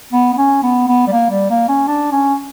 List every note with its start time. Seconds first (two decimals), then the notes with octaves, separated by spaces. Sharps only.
0.13 B3
0.33 B3
0.37 C#4
0.63 B3
0.88 B3
1.07 G3
1.12 A#3
1.30 G3
1.50 A#3
1.68 C#4
1.87 D4
2.12 C#4